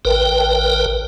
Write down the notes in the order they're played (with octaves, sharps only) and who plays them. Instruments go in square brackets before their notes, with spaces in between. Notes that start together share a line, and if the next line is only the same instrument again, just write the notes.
[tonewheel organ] A1 A#4 B4 G5